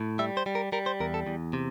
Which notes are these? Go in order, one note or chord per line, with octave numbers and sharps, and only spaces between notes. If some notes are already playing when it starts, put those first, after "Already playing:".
Already playing: A2
G3 E5
C5
G3
A#4
G3 A#4
C5
E2 A#4
A4
E2
C3